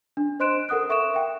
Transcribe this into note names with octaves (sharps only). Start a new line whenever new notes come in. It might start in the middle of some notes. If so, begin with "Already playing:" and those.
D4
C5 D#5 C6 F#6 D7 E7
A4 A#4 F#5 D#6 F#6
E5 C#6 D7 E7
E5 F#5 G5